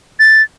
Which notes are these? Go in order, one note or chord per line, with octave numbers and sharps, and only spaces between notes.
A6